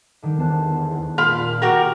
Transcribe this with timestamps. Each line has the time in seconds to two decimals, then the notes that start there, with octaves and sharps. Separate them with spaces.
0.22 D3 D#3 G3
0.38 E2 C5 A5 F#6
1.18 A#2 F5 B5 C6
1.62 F#4 G4 A#4